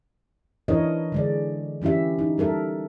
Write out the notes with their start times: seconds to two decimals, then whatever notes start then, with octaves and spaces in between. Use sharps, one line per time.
0.68 E3 D4 E4 A#4 C#5 D#5
1.12 D3 G#3 D5
1.82 E3 C#4 E4 G4 E5
2.19 D#4
2.38 G3 A4 A#4 E5